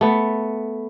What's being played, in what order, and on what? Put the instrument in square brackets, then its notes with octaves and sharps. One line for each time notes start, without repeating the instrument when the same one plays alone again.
[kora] A3 B3